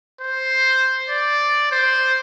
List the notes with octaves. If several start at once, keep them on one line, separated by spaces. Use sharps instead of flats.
C5
D5
C5